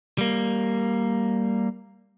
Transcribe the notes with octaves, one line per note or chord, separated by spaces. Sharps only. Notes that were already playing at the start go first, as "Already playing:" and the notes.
G3 A#3